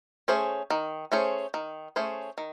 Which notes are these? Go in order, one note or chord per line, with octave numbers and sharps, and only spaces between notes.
A3 C#4 G#4 C5
D#3
A3 C#4 G#4 C5
D#3
A3 C#4 G#4 C5
D#3